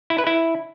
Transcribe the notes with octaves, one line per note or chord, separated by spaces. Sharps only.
E4
B4
E4